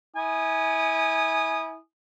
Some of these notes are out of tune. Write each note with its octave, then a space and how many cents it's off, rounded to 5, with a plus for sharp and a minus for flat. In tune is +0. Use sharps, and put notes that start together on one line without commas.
E4 -30 G#5 +0 D#6 -20